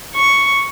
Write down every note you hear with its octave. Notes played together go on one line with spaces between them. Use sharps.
C#6